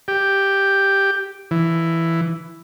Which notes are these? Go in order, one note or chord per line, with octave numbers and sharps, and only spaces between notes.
G4
E3